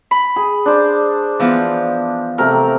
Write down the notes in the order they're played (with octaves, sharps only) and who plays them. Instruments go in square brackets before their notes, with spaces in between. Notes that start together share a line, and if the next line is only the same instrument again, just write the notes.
[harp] B5
[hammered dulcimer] G#4
D4 C5
[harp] E3 F3 B3
[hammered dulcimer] C3 A3 A#4